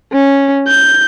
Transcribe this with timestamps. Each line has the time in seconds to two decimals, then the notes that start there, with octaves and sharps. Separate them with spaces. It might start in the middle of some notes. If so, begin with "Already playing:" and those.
0.13 C#4
0.68 G6